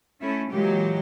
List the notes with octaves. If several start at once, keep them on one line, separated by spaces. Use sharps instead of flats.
A3 C#4 E4
A#2 E3 F#3 G#3 G4